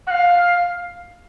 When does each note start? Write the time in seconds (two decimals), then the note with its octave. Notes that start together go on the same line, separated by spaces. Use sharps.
0.07 F#5
0.11 F5